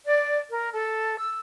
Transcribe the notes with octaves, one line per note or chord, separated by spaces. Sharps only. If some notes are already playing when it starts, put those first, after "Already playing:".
D5
A#4
A4
E6